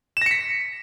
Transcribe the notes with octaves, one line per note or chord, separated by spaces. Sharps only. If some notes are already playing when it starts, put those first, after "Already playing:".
A#6 B6 C#7 E7